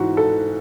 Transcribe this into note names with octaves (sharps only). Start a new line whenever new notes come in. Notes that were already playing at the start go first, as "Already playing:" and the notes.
Already playing: G#2 E3 F#4
A4